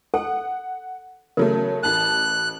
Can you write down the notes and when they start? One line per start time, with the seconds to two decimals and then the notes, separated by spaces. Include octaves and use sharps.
0.14 A4 F#5
1.37 C#3 F#3 A3 A#4
1.83 A1 A5 F#6